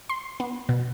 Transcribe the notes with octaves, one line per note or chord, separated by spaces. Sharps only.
C6
B3
B2